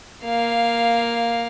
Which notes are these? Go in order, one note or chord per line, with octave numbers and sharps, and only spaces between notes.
A#3 F5